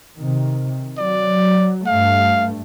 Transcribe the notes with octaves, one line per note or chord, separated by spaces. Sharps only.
C3 D#3
F#3 D5
G2 A3 F5